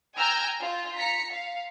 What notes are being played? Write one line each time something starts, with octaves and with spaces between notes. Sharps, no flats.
G5 G#5 A#5 E6 F6 G6
F4
A#5 B6 C#7
F5